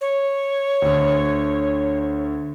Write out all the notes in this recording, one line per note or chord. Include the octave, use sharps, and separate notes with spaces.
C#5
D2 D3